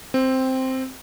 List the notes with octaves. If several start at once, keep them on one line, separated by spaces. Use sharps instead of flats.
C4